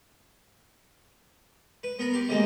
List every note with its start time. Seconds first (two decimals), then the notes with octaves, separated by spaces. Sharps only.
1.83 B4
1.99 B3 A#4 B5
2.13 G4 C6
2.29 D3 D#3 G3 G#3 A#3